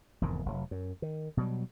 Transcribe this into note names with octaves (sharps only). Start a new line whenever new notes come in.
F1 E2 G#2 D#3
F1 F#3
F#2
D#3
B2 F#3 G3